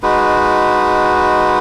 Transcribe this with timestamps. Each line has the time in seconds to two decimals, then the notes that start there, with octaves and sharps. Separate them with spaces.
0.03 G#3 D#4 F#4 B4